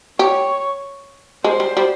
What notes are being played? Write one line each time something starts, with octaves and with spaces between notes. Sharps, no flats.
G4 C#5
G#3 C5
G3
G3